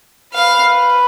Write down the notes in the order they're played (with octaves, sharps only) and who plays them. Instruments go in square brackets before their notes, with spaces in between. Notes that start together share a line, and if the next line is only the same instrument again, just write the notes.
[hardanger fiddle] B4 [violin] F5